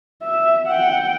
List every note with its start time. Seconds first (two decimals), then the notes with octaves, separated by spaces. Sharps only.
0.22 E5
0.67 F#5 G5